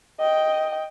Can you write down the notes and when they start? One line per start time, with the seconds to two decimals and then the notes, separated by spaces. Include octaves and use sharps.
0.20 D#5 G5